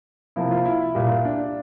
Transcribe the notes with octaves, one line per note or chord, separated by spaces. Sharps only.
C3 F3 A#3 E4
F4
E4
A#2 G3 A#3
D4